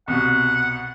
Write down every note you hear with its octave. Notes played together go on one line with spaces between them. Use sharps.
C2 B2 F#5